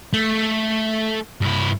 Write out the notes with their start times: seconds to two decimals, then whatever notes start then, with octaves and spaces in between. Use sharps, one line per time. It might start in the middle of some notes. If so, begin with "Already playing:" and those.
0.13 A3
1.41 G2 E4